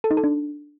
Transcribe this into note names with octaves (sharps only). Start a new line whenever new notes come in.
A4
D#4
A4
D4